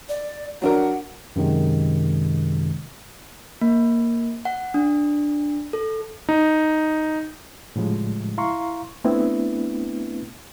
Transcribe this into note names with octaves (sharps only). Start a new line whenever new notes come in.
D5
F#3 D4 A#4 F#5
F#2 C3 D#3 G#3
A#3
F#5
D4
A4
D#4
A2 C#3 F3 G3 G#3
E4 F5 A#5 C6 C#6
A3 B3 C4 D4 E4 B4